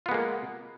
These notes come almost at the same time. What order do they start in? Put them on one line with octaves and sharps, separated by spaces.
F4 B3 G#3 A#3